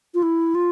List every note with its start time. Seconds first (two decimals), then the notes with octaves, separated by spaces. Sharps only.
0.14 F4
0.23 E4
0.55 F4